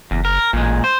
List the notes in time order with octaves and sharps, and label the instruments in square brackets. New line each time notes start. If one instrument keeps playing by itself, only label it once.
[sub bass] F#1 [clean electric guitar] E2
[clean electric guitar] A#4
[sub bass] A1 [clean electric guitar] A#2 G#3
[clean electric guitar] C5